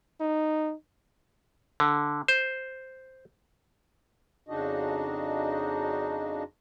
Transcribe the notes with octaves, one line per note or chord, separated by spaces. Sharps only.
D#4
D3
C5
F2 C#3 D4 D#4 F#4 D#5